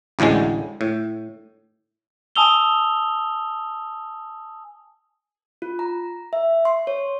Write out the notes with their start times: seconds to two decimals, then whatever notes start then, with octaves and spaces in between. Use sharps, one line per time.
0.19 A1 D2 A2 D3 G#3
0.81 A2
2.35 G#5 A5 D#6 E6 F7 G7
5.62 F4
5.79 A#5
6.33 E5
6.65 C6
6.87 C#5